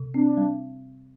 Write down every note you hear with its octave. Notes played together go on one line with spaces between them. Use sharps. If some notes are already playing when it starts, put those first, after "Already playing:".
Already playing: C3
C4 D4
G3